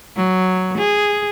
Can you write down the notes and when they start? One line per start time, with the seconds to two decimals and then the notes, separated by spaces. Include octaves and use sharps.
0.17 F#3
0.78 G#4